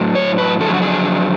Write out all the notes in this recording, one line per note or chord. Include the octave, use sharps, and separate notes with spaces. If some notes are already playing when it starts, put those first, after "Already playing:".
Already playing: A2 F#3
C#5
B4
F2 D3 F#3 A4
G#4
F#4
G#4